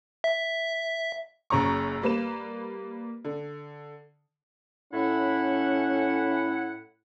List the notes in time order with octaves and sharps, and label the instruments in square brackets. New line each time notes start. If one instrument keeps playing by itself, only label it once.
[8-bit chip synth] E5
[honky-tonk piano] F#1 F#2 A#5 C#6
G3 A#3 B4 E7
D3
[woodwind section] A2 E4 F#5 [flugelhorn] C#4